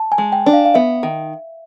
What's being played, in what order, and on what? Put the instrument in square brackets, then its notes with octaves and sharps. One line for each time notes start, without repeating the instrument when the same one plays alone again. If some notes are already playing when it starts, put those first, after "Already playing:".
Already playing: [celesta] A5
G#5
[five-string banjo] G#3
[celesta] G5
[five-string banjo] D4
[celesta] F5
F5
[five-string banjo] B3 [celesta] E5
[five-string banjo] D#3